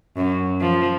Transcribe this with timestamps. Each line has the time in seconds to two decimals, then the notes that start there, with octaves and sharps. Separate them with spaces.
0.17 F#2
0.61 F3